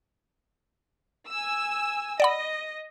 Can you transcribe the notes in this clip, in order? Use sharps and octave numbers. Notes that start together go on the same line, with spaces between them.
G#5 E6
D5 D#5 F#5 B5